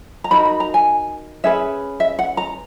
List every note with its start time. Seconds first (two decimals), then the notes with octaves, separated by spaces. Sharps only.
0.24 A#5
0.31 D#4 F#4 A#4 B5
0.45 B5
0.60 A#5
0.74 G#5
1.44 C#4 G#4 B4 E5
2.00 E5
2.19 F#5
2.37 A#5